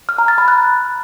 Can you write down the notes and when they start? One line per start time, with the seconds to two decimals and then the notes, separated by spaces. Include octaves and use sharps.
0.09 F6
0.18 A#5
0.28 A6
0.38 B5
0.48 F#6